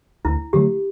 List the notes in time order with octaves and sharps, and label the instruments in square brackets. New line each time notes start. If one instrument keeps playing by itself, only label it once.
[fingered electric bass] D2 [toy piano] E4
[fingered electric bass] D3 F#3 A3 [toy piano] G4